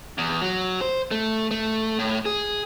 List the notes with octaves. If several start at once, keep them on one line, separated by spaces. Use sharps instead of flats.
E2
F#3
C5
A3
A3
A2
G#4